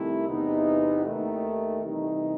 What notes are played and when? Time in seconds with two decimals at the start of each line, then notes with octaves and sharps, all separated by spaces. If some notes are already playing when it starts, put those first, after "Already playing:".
Already playing: C2 C3 D#3 A3 E4
0.28 E2 C3 E3 B3 D#4
1.05 D#2 D#3 A3
1.82 C3 E3 G3 D#4